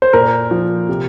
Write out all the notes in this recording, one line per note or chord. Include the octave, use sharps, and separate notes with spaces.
C5
A#2 A#4
F3
C3